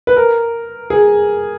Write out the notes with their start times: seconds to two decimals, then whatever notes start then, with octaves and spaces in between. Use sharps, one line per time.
0.07 B4
0.17 A#4
0.90 G#4